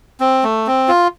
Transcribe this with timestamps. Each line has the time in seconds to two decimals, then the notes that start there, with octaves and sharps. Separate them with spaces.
0.20 C4
0.44 A3
0.67 C4
0.88 F4